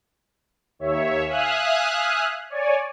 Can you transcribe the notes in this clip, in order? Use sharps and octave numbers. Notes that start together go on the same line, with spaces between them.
D#2 C#5 E5
E5 F5 G#5 D#6 F6 F#6
C#5 D5 G#5